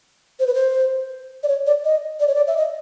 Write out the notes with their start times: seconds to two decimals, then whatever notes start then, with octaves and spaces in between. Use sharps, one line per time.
0.40 C5
0.47 B4
0.54 C5
1.43 D5
1.48 C#5
1.66 D5
1.85 D#5
2.20 D5
2.28 C#5
2.35 D5
2.47 E5
2.57 D#5